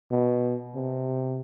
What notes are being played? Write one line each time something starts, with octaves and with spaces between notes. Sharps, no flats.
B2
C3